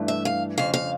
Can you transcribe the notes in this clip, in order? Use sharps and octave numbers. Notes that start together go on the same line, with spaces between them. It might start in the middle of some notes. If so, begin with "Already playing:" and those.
Already playing: G2 E3 A3
E5
F5
F2 C#3 F5
F5